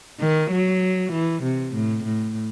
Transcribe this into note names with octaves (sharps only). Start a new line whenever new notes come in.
D#3
F#3
E3
C3
A2
A2